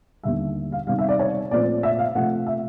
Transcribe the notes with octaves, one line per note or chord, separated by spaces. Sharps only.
D#2 D3 G3 E5
F5
C3 D#3 G3 F5
E5
D5
C#5
A#2 F3 A3 C4 D5
E5
F5
C3 F3 A3 F#5
E5